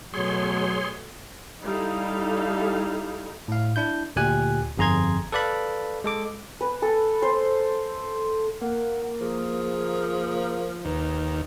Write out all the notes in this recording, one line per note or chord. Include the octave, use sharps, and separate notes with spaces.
B2 F#3 A3 G#4 C#5 C6
G3 D#4 E4 A4 F5
A2 F5
D4 E4 G6
D2 A#2 G4 G#5 F#6
G1 F2 G#4 A#5 C6 G#6
A4 B4 D5 F5 B5
G#3 A4 D6
B4
A4
C5
A#3 F#5
F3 G#4
D#2 B4